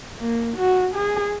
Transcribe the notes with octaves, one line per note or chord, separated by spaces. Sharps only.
A#3
F#4
G#4